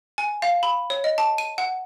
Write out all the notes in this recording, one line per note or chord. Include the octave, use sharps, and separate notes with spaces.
G#5
F5
B5
C#5
D#5
A5
D#7
F#5